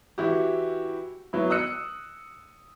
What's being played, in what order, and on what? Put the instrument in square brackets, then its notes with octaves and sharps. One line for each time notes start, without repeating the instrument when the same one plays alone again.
[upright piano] E3 E4 F#4 G4
F#3 B3 E4
D#6 E6 F#6 C#7